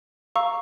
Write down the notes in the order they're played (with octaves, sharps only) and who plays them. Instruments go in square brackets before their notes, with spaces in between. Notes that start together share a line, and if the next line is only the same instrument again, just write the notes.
[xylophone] F5 A#5 C#6 E6